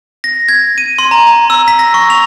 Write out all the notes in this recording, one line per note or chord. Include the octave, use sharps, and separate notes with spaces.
A#6
G#6
D#7
C6
A#5
A#5
E6
B6
A#6
C#6
F7